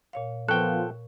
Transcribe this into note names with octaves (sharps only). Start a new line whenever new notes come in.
A#2 C#5 F5
F3 B3 A4 A#4 G5 C#6 F#6